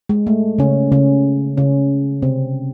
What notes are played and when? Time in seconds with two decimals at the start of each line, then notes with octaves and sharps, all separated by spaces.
0.09 G#3
0.27 A3
0.58 C#3 C#4
0.92 C#3 C#4
1.57 C#3 C#4
2.22 C3 C4